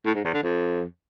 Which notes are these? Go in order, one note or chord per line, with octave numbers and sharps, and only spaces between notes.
A2
G#2
E2
D3
F2